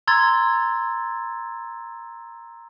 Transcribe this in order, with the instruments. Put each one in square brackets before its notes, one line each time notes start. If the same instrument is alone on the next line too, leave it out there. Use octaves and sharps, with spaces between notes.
[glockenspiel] A#5 C6 E6 G#6 A6